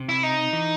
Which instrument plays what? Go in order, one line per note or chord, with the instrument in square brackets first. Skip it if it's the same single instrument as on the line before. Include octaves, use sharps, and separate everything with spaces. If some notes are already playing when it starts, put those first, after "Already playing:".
Already playing: [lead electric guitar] C3
[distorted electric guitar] E4
D#4
[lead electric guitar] E3